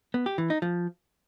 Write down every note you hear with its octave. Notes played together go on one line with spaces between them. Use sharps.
B3
G4
E3
D#4
F3